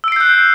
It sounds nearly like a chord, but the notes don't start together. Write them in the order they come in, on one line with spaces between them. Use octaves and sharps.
E6 D7 C7 G6 F#6